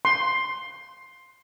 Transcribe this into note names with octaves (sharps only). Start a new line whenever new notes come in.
C6